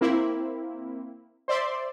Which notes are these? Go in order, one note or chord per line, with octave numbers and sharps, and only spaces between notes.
A#3 C4 E4
C5 D5 E5 C6